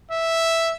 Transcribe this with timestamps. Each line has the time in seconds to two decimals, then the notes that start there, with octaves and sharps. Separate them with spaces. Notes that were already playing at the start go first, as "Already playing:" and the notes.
0.11 E5